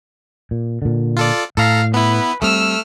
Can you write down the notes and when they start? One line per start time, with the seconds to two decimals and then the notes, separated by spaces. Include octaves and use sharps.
0.51 A#2
0.82 A#2 D3
1.17 F4 A4 D5
1.57 A2 A4 F5 A#5
1.94 B3 E4 B4
2.42 G3 A3 C4 E6 F6